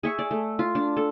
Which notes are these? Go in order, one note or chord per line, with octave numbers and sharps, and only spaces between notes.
G#4 E5 C#6
D5
A3
F4
D4
A4